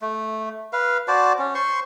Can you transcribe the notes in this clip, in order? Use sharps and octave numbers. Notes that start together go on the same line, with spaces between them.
A3
B4 F5
F#4 C5 D5 A5
C#4
C5 C6 C#6